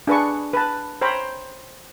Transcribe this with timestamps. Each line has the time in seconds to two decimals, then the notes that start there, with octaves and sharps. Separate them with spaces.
0.07 D4 G#4 B4 A5 C#6
0.53 B4 A5
1.01 C5 C#5 G5 A#5 B5